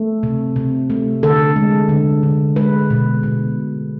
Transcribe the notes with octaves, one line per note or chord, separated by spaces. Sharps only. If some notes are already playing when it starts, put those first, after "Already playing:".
Already playing: A3
C3
C3
A3
D3 A4
G#3
D3
D3
G#3 B4
B2
B2